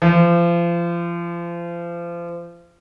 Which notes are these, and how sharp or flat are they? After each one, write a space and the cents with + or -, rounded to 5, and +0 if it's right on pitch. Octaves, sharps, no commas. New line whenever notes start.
F3 -30